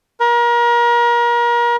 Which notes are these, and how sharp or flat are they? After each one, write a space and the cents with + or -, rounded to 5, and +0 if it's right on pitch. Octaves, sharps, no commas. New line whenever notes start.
A#4 +35